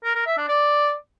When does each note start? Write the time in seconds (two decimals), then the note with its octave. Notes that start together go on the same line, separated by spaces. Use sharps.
0.04 A#4
0.15 A#4
0.26 E5
0.38 D4
0.49 D5